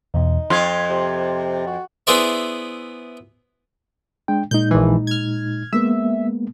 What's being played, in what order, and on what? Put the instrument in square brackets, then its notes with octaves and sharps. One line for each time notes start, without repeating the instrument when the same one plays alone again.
[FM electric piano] E2 B2 [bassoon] D#4
[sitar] F2 F4 [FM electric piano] C6 G#6
[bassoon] C3
F#4
[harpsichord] B3 E4 G#4 C5 D5 E5
[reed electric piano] G#3 D4 G5
[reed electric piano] A#2 G#3 D#4 [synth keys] G6
[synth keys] A#1 E3
F6 G#6
[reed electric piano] G#3 A#3 B3 [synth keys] E5